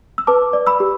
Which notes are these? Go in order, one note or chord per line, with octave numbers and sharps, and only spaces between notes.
E6
B4 A5 D6
D5
B5 E6
G4